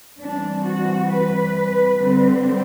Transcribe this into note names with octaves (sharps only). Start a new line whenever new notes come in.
E3 G3 C4 D4
F#4
B4
D3 G3 C4